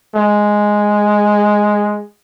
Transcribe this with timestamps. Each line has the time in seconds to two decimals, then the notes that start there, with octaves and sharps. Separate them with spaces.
0.15 G#3